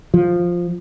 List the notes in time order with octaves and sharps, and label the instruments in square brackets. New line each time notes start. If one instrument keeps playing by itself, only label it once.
[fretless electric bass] F3